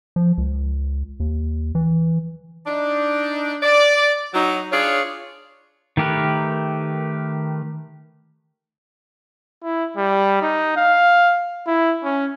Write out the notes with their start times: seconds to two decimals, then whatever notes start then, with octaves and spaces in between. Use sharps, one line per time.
0.16 F3
0.38 C#2
1.20 D#2
1.75 E3
2.66 D4 D#4
3.63 D5
4.34 F#3 D#4
4.72 D4 F4 G#4 C#5
5.97 D#3 A3 G4 A#4 B4
9.63 E4
9.97 G3
10.42 D#4
10.77 F5
11.67 E4
12.04 C#4